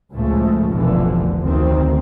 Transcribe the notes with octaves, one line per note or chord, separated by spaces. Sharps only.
C#2 A2 F3 G#3 A3
F1 B1 D3 E3 F3
D2 D#3 C4